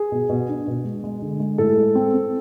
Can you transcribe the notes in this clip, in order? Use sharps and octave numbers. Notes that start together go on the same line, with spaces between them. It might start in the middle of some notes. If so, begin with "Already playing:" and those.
Already playing: G#4
B2
B2
D4
B2
G#3
G#3
D3
G#3
A2 A4
G#3
C4
C4